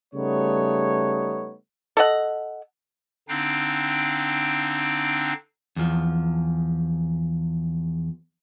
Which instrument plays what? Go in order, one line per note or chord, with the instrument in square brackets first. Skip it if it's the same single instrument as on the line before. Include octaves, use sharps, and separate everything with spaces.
[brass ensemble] C#3 G3 A3 B3 D#4 C#5
[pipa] A4 D#5 F#5
[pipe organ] D3 C4 D4 D#4 F5 G5
[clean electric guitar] E2 F3